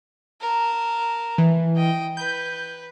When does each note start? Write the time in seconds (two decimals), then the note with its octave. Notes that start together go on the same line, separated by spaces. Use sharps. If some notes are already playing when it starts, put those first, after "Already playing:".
0.41 A#4 A5
1.38 E3
1.76 D#5 G5
2.17 B4 G6